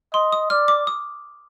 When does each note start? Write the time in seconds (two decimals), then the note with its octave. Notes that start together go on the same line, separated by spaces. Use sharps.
0.14 D#5 C6
0.33 D#6
0.50 D5 F6
0.68 D6
0.87 D#6